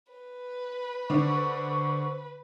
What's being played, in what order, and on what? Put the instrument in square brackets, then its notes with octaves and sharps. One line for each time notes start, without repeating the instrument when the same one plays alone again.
[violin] B4
[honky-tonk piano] D3 D4 [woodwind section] C5 C#6